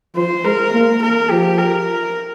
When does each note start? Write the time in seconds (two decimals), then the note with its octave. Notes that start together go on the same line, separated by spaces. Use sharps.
0.16 F3 C5
0.44 G#3 A#4
0.73 A#3
1.02 A#4
1.30 F3 G4
1.58 A#4